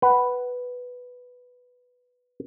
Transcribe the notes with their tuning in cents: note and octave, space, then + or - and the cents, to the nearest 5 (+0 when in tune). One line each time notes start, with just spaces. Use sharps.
B4 +0 F#5 +20